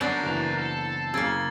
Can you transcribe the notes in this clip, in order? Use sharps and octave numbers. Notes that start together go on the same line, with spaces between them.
F#3 B3 D4 A#4 F#5 G6 A6 C7
F#1 E3 F7
A4
F#1 C#3 A#3 E6 G#6 A6 C7